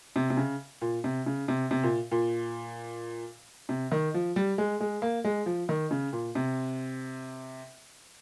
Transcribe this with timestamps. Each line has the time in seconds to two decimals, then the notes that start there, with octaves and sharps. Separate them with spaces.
0.16 C3
0.30 C3
0.37 C#3
0.82 A#2
1.04 C3
1.26 C#3
1.48 C3
1.71 C3
1.84 A#2
2.12 A#2
3.69 C3
3.92 D#3
4.14 F3
4.36 G3
4.58 G#3
4.80 G#3
5.02 A#3
5.25 G#3
5.46 F3
5.69 D#3
5.91 C#3
6.13 A#2
6.35 C3